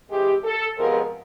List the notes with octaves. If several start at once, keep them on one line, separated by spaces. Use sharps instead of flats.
C3 E3 G#3 G4
A4
F2 C3 F3 G#3 B3 A#4